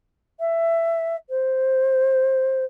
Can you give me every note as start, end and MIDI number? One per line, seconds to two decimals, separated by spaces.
0.39 1.16 76
1.29 2.64 72